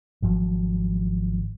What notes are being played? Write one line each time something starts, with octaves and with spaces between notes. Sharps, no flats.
G#1 F3 F#3